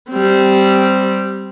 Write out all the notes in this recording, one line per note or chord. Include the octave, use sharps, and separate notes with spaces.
G3 C4